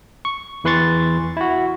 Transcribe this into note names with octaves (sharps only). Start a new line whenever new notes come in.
C#6
E2 E3 B4 C6 C#6 A6
E4 F#4